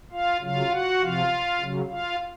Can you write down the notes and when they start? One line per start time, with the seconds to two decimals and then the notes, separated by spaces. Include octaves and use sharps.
0.12 F4 F5
0.41 C#3 F#3 F4 F5
0.71 F#4 F#5
1.00 C3 F3 F4 F5
1.60 C#3 F#3
1.89 F4 F5